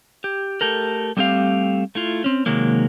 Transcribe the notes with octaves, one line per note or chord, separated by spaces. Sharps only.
G4
A3 G4 A4 A#4
G3 A3 C4 G4 F5
A3 E4 F4
C4 C#4
C3 D#3 F#3 G#3 A#3